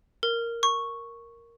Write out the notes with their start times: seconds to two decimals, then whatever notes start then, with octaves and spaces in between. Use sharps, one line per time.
0.23 A#4
0.63 C#6